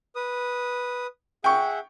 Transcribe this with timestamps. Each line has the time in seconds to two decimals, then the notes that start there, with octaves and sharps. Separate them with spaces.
0.16 B4 D#6
1.44 G#4 E5 F#5 G5 C#6